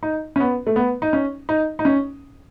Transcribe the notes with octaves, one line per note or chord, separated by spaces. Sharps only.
D#4
C#4
B3
A3
B3
D#4
C#4
D#4
D#4
C#4